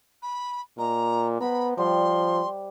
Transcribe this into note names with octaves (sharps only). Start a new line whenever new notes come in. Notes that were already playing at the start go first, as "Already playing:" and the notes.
B5
A#2 D#5 A#5
B3 C5 F#5 A#5 B5
F3 G3 C6